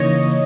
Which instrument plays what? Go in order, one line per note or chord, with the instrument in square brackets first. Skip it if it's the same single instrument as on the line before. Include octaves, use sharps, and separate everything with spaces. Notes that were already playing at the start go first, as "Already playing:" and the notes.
Already playing: [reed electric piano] C#3 E3 A#3 D#4 [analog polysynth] C#5 D#5